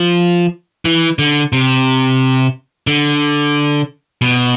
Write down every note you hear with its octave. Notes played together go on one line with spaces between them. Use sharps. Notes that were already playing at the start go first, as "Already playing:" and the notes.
Already playing: F3
E3
D3
C3
D3
B2